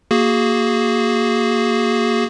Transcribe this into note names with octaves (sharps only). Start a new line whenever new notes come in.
A#3 F#4 G#4